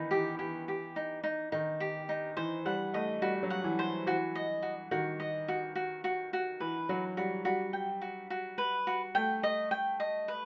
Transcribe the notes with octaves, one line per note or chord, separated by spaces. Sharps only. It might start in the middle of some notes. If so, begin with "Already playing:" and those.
Already playing: D#3 E3 B3 D#4
E3 G4
E3 G4
G4
D#4
D#4
D#3 D#4
G4
D#4
E3 C5
G3 F#5
A3 D#5
G3 F#4
F#3
F#5
E3
C5
E3 F#4
D#5
F#4
D#3 F#4
D#5
F#4
F#4
F#4
F#4
E3 B4
F#3 F#4
G3 F#4
G3 F#4
G5
F#4
F#4
B4
F#4
A3 G5
D#5
G5
D#5
B4